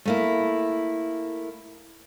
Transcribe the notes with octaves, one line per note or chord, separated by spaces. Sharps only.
A3 A#3 E4